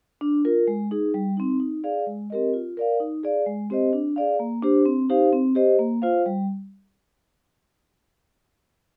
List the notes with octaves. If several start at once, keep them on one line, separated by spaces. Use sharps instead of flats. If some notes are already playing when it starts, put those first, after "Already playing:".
D4
F4 A#4
G#3
D#4 G#4
G3
C4 D#4
D#4
G#4 D5 F5
G#3
C4 G4 A#4 D#5
F4
A#4 D5 F5
D#4
G#4 D5 F5
G#3
C4 G4 C5 D#5
D4
G#4 D5 F5
A#3
D4 G4 C5
C4
D#4 G4 C5 F5
C4
G4 C5 D#5
A#3
F4 C5 F5
G3